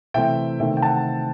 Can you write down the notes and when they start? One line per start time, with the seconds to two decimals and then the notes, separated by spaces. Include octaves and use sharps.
0.14 C3 E3 A3 C4 E5 G5
0.60 C3 D#3 A3 C4 E5 G5
0.77 G5
0.82 F#5 A5